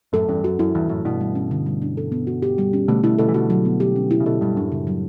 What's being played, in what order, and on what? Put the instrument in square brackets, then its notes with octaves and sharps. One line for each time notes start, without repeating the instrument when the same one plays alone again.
[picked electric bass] F#2 A2 [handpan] A4
[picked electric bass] E2 G2 [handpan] C#4
[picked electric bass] F#2 [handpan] F#4
[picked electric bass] F#2 [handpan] E4
[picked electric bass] E2 G2 [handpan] E3
[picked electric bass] F#2 A2 [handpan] A3
[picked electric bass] G2 B2 [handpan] E4
[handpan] G3
C#4
D3
G3
D4
A4
B3
F#4
G4
G3
C#4
[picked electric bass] B2 D3 [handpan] A3
[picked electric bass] B2 D3 [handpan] E4
[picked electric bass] B2 D3 [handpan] A4
[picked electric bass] E3
[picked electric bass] B2 D3 [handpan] F#4
[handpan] F#3
B3
G4
C#4
E4
[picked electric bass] C#3
[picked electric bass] B2 D3 [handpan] A4
[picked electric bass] G2 B2 [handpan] G3
[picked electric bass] F#2 A2 [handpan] D4
[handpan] C#3
F#3